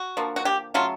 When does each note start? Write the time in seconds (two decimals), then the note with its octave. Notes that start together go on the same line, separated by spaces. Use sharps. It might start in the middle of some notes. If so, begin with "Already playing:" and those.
Already playing: F#4
0.17 D3 F3 A#3
0.36 F#4
0.45 G4
0.74 C#3 F#3 A3 F4